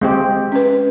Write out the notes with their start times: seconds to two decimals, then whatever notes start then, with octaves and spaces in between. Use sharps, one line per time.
0.01 G#3 C4 G4
0.52 C#4 B4